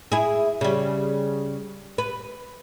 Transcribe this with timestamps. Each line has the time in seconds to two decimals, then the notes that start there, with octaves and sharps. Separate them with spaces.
0.12 E4 G#4
0.61 C#3 G3
1.98 B4